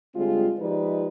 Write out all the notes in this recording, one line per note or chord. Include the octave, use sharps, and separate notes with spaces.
D3 G3 G#3 C4 F4 G#4
F3 G#3 D#4 G4 B4 D5